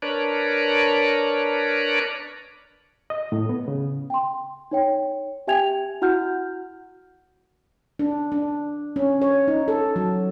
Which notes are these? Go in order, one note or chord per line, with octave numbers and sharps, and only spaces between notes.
D4 A#4 B4 C#5 D5
D#5
A2
B3
C#3
G5 C6
D#4 C#5 G5
G4 E5 G5 G#5 G#6 F7
E4 F#4 F#5 F6 G6
D4
D4
C#4
C#5
D#4
A4
F#3